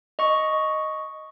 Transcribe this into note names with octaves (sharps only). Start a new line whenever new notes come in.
D#5 C#6